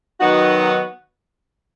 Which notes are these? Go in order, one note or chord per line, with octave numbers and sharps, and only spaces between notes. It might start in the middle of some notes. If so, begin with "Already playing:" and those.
D#3 F#3 B3 D#4 F#4